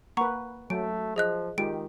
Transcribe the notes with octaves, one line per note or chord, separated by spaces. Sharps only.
A#3 B4 F#5 A#5 C#6
F#3 A3 D7
F3 G#4 D#5 F#6
D#3 G#3 F4 G4 D7